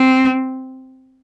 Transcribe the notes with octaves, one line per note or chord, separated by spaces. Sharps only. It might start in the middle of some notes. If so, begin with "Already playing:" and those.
Already playing: C4